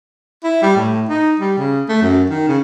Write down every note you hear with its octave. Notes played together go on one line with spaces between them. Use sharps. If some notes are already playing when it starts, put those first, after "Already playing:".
E4
G3
A2
D#4
G3
C#3
A3
F#2
D#3
C#3